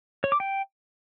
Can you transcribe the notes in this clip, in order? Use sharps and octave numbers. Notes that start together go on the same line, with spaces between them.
C#5
D6
G5